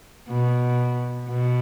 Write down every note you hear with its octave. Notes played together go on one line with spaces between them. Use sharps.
B2
B2